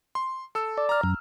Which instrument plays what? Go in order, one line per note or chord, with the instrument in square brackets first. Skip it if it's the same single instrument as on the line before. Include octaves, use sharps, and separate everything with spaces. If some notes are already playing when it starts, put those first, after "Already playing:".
[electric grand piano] C6
A4 E6
[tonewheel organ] D5
[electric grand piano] A#5 F6
[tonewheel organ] F#2